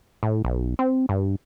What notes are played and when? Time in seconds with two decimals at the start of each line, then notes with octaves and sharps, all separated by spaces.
0.23 A2
0.45 B1
0.79 C4
1.09 G2